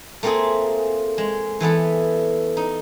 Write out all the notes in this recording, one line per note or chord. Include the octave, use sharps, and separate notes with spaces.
A3 A#3 C4 F4 G#4
G#3
E3 A3 B3 A4
D#4